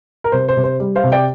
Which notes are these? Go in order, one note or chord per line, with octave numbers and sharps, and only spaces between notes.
A#4
C3 C5
C5
C3
C5
G3
C5 F5
C3
D5 G5